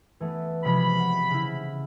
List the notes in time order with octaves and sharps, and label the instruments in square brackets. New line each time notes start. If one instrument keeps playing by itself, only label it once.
[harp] E3 A3 B3
[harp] C3 F3 G#3 [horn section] B5
[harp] F#5
C#3 E4